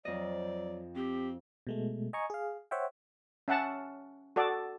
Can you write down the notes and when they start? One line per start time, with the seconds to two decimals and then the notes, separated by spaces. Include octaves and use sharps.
0.05 F2 F#3 D5 D#5
0.96 C4 G4
1.67 B2 G#3 A3
2.13 D#5 G#5 A#5 C#6
2.30 G#4 F5
2.71 C5 C#5 E5 F#5 G5
3.48 C#4 E5 F#5 A5
4.36 F#4 A4 D5